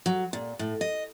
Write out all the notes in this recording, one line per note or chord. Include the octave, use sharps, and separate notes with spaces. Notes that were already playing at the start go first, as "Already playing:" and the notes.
F#3
A#2
A2
D#5